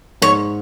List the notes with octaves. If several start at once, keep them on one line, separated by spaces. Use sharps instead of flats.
G#2 C#5